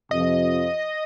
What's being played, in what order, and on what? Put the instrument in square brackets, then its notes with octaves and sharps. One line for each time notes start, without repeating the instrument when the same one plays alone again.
[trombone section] F2 C3 F3 [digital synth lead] D#5